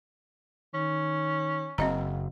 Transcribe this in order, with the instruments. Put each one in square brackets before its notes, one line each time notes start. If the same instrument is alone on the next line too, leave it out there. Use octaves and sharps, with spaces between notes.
[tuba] D#3 [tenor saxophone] C#4
[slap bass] F#1 [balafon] C4 D#5 A#5